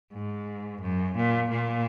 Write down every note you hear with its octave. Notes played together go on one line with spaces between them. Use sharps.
G#2
F#2
A#2
A#2